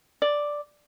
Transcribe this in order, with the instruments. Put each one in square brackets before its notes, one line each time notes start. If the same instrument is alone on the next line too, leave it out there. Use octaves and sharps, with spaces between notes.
[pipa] D5